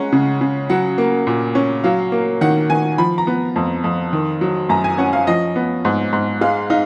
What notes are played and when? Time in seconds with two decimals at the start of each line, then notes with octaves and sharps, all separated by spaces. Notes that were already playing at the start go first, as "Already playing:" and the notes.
Already playing: G#3 C#4 F#5 A#5
0.12 C#3
0.41 C#3
0.70 F#3 F#5
0.98 A#3
1.27 A#2
1.55 C#4
1.84 F#3 F5
2.12 A#3
2.41 D#3 F#5
2.70 D#3 G#5
2.98 F3 B5
3.18 A#5
3.27 B3
3.56 F2
3.84 F2
4.13 D#3
4.41 F#3
4.69 F#2 A#5
4.84 G#5
4.98 C#4 F#5
5.13 F5
5.27 F3 D#5
5.56 B3
5.85 G#2
6.13 G#2
6.41 G#3 F5
6.70 D#4 F5